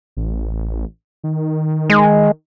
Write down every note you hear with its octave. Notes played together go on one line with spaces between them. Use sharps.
A1
D#3
G#3